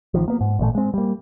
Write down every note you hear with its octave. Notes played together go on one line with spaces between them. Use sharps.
A1 D#3 F3
A#3 B3
G#2
A1 A#2 F#3 A3
G#3 C4
G3 A#3